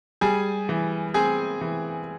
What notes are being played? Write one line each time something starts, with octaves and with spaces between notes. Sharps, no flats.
G3 G#4 G#5
E3
C4 G#4 G#5
E3